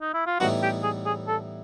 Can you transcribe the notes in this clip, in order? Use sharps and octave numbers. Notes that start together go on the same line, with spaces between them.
D#4
E4
F4
A2 E3 G3 B3 D#4 F#4
G4
G#4
G#4
A4